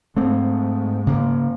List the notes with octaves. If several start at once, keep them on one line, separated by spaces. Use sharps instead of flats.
G#2 A3 C4
C#3 A#3